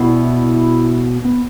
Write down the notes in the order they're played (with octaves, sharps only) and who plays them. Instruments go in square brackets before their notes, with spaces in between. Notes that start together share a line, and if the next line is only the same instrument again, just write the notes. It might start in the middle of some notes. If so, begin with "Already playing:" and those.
Already playing: [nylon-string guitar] B2 G3 B3 F#4 [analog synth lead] E4
[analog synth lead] B3